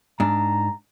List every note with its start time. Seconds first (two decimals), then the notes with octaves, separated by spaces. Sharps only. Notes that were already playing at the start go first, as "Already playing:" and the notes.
0.20 G#2 D4 A#5